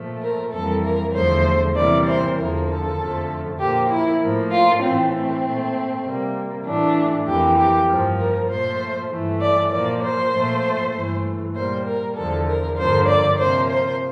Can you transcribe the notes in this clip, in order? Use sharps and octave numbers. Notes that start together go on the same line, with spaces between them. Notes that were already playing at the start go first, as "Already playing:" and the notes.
Already playing: A#2 F3 A3
A#4
F2 E3 G3 A#3 A4
A#4
E2 D3 F3 A3 C5
C3 E3 G3 A#3 D5
C5
E2 D3 F3 A#3 A#4
A4
F2 D3 F3 A3
A#2 F3 A#3 G4
E4
A2 F3 A#3
F4
A2 E3 A3 C4
C4
A#2 A3
C3 G3 A#3
A2 E3 A3 D4
F2 E3 A#3 G4
G4
G2 F3 A#3
A#4
A#2 F3 A3 C5
G2 E3 A3
D5
A#2 F3 A#3 D5
C5
A#2 F3 A3
G2 E3 A3
A#2 G3 A#3 C5
A#4
E2 D3 F3 A4
A#4
G2 D3 F3 A#3 C5
D5
C3 F3 A#3 C5
C5